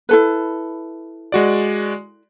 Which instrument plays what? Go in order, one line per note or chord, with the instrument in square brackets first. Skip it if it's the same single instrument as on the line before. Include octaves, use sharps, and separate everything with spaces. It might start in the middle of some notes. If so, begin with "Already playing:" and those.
[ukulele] E4 A4 B4
[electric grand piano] G#3 F#4 D5